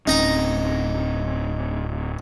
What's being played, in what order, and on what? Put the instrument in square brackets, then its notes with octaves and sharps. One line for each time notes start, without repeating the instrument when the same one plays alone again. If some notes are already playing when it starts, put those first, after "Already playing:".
[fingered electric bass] D1 C4 C#4 [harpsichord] D#4 A#5